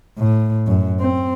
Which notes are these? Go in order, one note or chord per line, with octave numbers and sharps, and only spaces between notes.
A2
F#2
C4